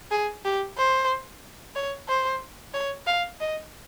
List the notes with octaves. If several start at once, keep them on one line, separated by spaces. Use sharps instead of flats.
G#4
G4
C5
C#5
C5
C#5
F5
D#5